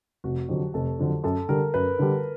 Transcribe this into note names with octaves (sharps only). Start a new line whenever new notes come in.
F1 F#4
F2 D3 F#3 G4
F1 A4
F2 D3 F#3
F#2 A4
D3 G3 A#4
F#2 B4
D3 G3